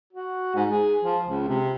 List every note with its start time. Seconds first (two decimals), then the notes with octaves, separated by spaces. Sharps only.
0.13 F#4
0.55 G#2
0.70 G#4
1.03 F3
1.27 C#2
1.48 C3